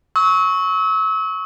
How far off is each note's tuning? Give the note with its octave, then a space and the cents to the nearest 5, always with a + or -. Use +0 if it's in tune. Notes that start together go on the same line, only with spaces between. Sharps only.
C#6 +0 E6 -35